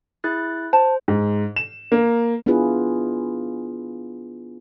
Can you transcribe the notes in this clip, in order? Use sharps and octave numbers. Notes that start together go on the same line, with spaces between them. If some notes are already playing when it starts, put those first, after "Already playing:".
E4 G#4 F#6 A6
C5 A5
G#2
E7
A#3
B3 D4 E4 F4 G#4 B4